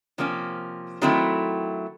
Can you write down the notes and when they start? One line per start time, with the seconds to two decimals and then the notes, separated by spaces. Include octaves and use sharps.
0.18 C3 F3 A#3 C#4
1.02 D#3 F#3 A3 C4 E4